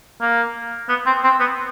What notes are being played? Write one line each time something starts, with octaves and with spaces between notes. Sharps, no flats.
A#3
B3
C4
C4
B3